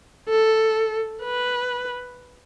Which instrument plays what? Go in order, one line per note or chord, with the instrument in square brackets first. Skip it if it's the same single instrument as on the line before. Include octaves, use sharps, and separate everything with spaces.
[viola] A4
B4